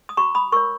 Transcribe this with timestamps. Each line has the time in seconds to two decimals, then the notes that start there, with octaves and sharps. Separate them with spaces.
0.09 D#6
0.17 F#4 A#5 C#6
0.35 B5 D#6
0.52 A#4 C#5 C#6 E6